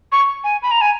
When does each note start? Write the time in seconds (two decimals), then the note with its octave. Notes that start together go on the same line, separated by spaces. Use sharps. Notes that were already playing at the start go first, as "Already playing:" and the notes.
0.12 C#6
0.44 G#5
0.62 B5
0.71 A#5
0.81 G#5